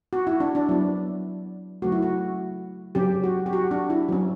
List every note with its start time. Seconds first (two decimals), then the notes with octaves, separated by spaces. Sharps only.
0.13 F#4
0.27 E4
0.40 D4
0.55 D4
0.69 F#3 B3 E4
1.82 C#3 F#3 A3 F#4
1.92 E4
2.02 F#4
2.95 C#3 F#3 C#4 G4
3.24 F#4
3.46 G4
3.53 F#4
3.71 D4
3.90 E4
4.08 F#3 C#4